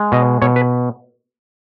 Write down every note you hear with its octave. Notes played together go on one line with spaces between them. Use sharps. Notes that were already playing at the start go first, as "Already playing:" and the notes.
Already playing: G#3
B2 D#5
B2 C#5
B4